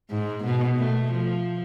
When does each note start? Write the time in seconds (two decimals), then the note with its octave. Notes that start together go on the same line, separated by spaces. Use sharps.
0.11 G#2
0.44 B2
0.77 A3
1.12 F3